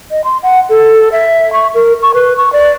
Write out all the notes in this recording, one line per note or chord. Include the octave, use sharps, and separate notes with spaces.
D#5
C6
F#5
A4
E5
C#6
A#4
C#6
B4
C#6
D5